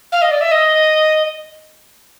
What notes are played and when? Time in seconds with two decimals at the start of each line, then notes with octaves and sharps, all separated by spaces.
0.12 F5
0.22 D#5
0.31 D5
0.41 E5
0.51 D#5